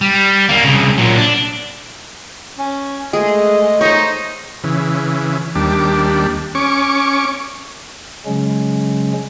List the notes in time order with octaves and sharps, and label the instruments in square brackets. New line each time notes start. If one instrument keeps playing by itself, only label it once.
[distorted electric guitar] G3
D3 A#3
C2 C#3
A#2 F#3
D4
[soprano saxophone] C#4
[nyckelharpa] G#3 A3 [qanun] G#4 [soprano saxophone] D#5
[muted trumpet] D#4 [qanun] C5 C#5
[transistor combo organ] C#3 E3
D#2 G3 D4
C#4 C#6 D6
[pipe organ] C#3 F#3 G#3 C#4